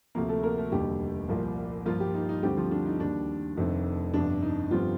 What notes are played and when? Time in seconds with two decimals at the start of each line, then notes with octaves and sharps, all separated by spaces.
0.15 D2 C3 F3 A3 A#3 A#4
0.29 A3 A4
0.43 A#3 A#4
0.58 A3 A4
0.72 F1 D#2 D3 G3 G4
1.29 C2 A#2 F3 A#3
1.86 G2 F3 A#3 F4
2.00 G3 G4
2.14 D#4
2.29 D#4
2.43 D2 D3 G3 C4 G4
2.57 F3 F4
2.71 D4
2.86 D#4
3.00 D#2 D#3 G3 D4
3.57 F1 F2 D#3 A3 C4
4.14 G1 F2 C3 D4
4.42 D#4
4.71 G1 G2 D3 F3 G3 C4 F4